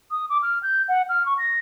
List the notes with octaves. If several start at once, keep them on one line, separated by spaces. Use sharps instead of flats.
D#6
D6
F6
G6
F#5
F6
C#6
A#6